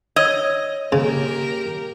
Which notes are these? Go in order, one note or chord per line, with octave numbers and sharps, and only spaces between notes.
C#5 D#5 E6 G#6
C#3 A#3 G4 A#4